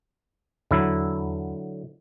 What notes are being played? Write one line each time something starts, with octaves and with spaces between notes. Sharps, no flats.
E2 D3 F#3 E4